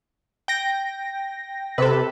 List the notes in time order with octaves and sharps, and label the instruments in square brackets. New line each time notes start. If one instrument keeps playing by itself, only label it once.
[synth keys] G5 A#6
[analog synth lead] C3 [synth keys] A4 B4